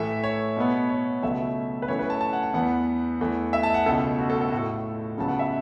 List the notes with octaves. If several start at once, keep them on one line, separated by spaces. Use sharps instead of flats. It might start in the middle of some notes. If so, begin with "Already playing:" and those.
Already playing: A2 E3 A3 E5
C#5
B2 B3
C#5
C#2 B2 F#3 A3 E5
B4
F#2 E3 A3 C#5
B4
A5
A5
F#5
A5
E2 E3 B3 F#5
E2 E3 A3
E5
A5
F#5
C#2 B2 A3 A4
F#4
A4
A4
A2 A3 F#4
A4
C#2 C#3 F#3 B3 A5
F#5
E5